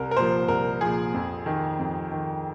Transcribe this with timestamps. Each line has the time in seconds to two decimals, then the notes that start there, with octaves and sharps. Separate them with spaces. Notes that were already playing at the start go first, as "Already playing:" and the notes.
Already playing: C2 A#4
0.11 A#4
0.17 A#2 F3 C5
0.48 C2 A#4
0.81 A#2 F3 G#4
1.14 F2
1.46 D#3
1.79 F2
2.12 D#3